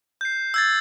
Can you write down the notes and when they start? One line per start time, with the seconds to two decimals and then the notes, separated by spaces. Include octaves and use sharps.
0.21 G6 C7
0.54 E6 G#6 A6